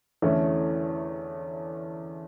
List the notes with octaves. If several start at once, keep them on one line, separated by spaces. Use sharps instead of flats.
E2 D3 A3 C#4 E4